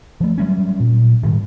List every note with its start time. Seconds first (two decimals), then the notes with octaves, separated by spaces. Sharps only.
0.20 F3 A3
0.38 F#3 G3 C#4
0.80 A#2
1.23 G#2 D#3 G3